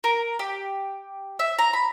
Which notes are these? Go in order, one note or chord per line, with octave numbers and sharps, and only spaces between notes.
A#4
G4
E5
A#5
B5